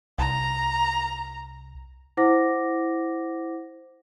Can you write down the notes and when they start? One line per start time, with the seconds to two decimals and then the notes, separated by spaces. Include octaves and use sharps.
0.19 C2 A#5
2.17 E4 C5 F#5 D6 A#6